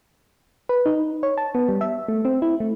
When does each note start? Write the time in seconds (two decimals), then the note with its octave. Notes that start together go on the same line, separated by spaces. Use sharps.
0.69 B4
0.86 D#4
1.23 C#5
1.38 A5
1.55 B3
1.69 G3
1.81 E5
2.08 A3
2.25 C4
2.42 E4
2.60 A3